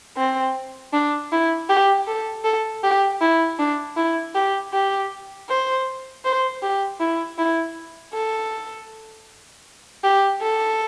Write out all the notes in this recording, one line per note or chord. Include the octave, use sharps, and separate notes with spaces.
C4
D4
E4
G4
A4
A4
G4
E4
D4
E4
G4
G4
C5
C5
G4
E4
E4
A4
G4
A4